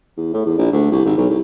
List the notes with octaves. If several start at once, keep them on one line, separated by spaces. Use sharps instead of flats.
E2
A2
E2
A#1
D2
C2
G#1
B1
C2